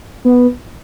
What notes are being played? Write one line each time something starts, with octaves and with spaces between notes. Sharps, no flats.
B3